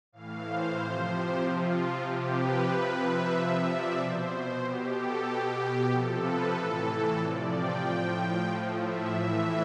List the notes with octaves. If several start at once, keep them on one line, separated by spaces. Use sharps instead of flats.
A2 E3 F5
C5
C3 F3
G4
C3 F3 F4
C3 F3 G4
B4
C3 F3
E5
C3 F3
D5
B2 C5
C5
B2 G4
A4
B2 G4
C3 F3 A4
B4
A2 E3 A4
C3 F3 D5
G5
A2 F3
A2 F3
E5
A2 E3 E5